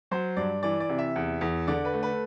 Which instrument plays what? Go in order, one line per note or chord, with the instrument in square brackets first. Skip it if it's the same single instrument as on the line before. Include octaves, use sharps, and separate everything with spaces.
[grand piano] F#3 C5
G2 D5
E3 D5
D5
C3
E5
E2
E2
D3 D5
B4
A3
B4